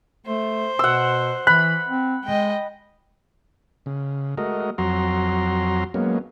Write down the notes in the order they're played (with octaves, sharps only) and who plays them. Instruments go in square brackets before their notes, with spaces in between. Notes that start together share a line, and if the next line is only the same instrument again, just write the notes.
[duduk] A3 [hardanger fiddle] C5
[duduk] B2 [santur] F#5 E6
[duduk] E3 [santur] B5 [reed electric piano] F#6
[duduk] C4
[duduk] G#3 [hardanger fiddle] D#5 G5
[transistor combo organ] C#3
G#3 A3 F#4 A#4 D#5
F2 F#3 F#4 A#5 C6
F#3 G#3 A#3 B3 C#4